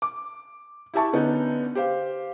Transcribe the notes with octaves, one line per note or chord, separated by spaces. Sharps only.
D6
E4 G4 E5 A5 C#6
D3 B3 C#4 D#4
G4 C5 F5